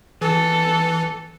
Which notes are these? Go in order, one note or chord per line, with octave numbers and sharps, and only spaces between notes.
E3 A4